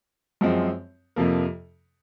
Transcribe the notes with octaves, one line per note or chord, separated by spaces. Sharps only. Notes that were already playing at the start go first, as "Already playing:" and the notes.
F#2 F3 G#3 C4
F2 C3 F3 A#3